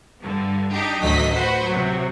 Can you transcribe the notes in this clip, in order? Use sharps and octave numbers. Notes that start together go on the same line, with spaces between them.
G2 D3
D4 D#4 G4
A1 D2 D#3 F#3 D#5 B6
F#4 B4 C5 F#5
C3 F#3